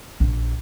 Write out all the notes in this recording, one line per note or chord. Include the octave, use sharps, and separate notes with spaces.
A#1